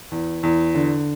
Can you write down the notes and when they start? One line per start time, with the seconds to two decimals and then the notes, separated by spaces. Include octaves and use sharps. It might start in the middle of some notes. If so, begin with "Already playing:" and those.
0.12 E2
0.43 E2
0.75 D3